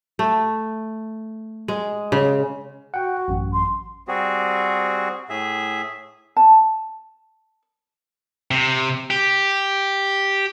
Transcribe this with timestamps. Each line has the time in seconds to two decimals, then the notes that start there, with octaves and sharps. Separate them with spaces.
0.19 A3
1.68 G#3
2.12 C#3
2.94 F#4 F#5 G5
3.28 A1 F#2
3.52 C6
4.08 G3 C4 F#4 G#4
5.29 A2 G#4 E5
6.37 A5
8.51 C3
9.10 G4